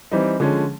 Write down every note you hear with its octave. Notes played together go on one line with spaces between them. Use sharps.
E3 G3 C4 D#4
D3 F3 G#3 C#4